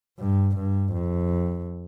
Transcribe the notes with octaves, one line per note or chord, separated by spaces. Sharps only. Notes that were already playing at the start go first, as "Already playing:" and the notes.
G2
G2
F2